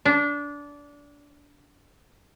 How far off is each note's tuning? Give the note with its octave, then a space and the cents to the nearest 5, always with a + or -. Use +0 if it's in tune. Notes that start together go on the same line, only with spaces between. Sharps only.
D4 -20